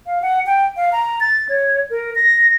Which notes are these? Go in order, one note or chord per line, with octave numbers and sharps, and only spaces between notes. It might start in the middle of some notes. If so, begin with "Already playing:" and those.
F5
F#5
G5
F5
A#5
A6
C#5
A#4
A#6